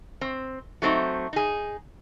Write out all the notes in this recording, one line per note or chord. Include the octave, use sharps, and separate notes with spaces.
C4
F#3 A3 C4 D#4
D#4 G#4